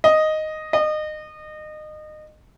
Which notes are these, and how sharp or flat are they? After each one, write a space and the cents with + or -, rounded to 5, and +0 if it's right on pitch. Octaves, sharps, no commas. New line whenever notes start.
D#5 +0
D#5 -25